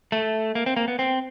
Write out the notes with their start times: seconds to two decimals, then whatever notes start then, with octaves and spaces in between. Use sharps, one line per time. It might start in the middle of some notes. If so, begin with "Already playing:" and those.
0.12 A3
0.55 A#3
0.66 C4
0.77 A#3
0.88 B3
0.99 C4